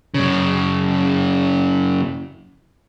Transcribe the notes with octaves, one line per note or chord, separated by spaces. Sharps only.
F#2 C#3